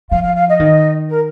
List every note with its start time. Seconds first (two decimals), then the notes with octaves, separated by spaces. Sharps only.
0.11 F3 F5
0.23 F5
0.36 F5
0.48 D#5
0.60 D#3
1.09 A#4